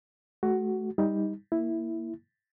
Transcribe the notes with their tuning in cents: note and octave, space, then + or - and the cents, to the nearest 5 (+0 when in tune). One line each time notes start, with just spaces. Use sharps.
A3 -35 F#4 +15
G3 +15 D#4 +15
A#3 +0 E4 +0